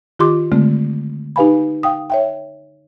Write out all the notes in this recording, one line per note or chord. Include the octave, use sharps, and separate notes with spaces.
D#3 F4 G4 C6 D6
D3 G#3 A3 C4
D#4 G4 B4 F5 G#5 B5
F5 G5 D#6
C#5 E5 G5